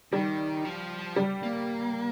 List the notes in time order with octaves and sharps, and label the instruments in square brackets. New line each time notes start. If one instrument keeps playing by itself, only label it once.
[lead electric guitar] D#3 [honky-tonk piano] G3
[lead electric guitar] F3
[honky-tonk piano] G3
[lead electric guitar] A#3